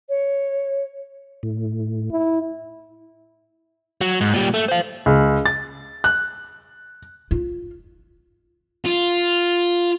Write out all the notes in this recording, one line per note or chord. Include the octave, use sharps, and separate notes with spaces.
C#5
A2
E4
F#3
G#2
A#2 G3
A3
C5 F5
C#2
A6
F#6
F4
F4